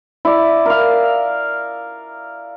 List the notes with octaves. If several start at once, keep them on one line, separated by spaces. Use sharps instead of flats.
E4 D5
A#4 F5